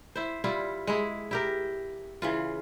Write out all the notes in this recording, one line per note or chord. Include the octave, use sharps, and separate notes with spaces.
E4 C5
G3 E4 F4
G#3 E4
E4 G4 A#4
C#3 E3 F4